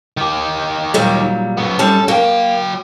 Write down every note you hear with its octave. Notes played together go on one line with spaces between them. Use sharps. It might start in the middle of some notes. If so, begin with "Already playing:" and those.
D#3 G4
A#2 F#3 G3
F#2 B3
F#2 G3 C#4 A4
F#3 A#3 G5